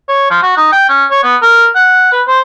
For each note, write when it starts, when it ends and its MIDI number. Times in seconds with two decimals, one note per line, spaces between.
0.09 0.28 73
0.31 0.39 53
0.43 0.53 66
0.57 0.71 63
0.73 0.85 79
0.89 1.05 61
1.11 1.22 73
1.24 1.36 59
1.42 1.69 70
1.76 2.08 78
2.12 2.22 71
2.27 2.40 72